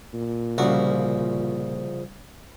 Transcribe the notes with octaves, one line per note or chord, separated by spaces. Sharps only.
A#2
C2 C#3 F3 F#4